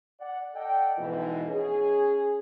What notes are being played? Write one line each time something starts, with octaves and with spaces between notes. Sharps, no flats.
D5 F#5
A4 D5 D#5 F#5 G5
F2 G#2 B2 E3
C#4 G#4